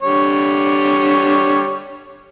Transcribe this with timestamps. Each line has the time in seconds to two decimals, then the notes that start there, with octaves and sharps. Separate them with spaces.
0.02 D3 G3 C#5